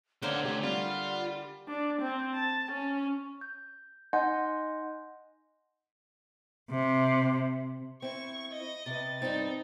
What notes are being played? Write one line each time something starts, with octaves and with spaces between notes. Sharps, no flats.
D3 A#3 B3 C5 C#5
C3 A3 G4
G3 F4 F#5
D4
C4
A5
C#4
G6
D#4 D#5 F#5 G#5 C6 G6
C3
C4 E4 C#6
D#5
C3 B4 A6
G2 C4 D#4